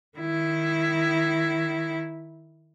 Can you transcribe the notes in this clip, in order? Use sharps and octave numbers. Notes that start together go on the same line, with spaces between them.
D#3 E4